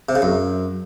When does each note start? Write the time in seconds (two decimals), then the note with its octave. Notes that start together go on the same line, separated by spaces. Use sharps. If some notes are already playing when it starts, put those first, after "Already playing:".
0.09 C3
0.15 C#3
0.22 F#2